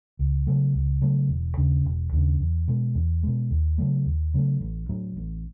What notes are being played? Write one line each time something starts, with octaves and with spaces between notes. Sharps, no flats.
C#2
C#3 F#3 A3
C#2
C#3 F#3 A3
E1
D#2 C#3
E1
D#2 C#3
E2
B2 G#3
E2
B2 G#3
D#2
C#3 F#3 A3
D#2
C#3 F#3 A3
A1
A2 F#3
A1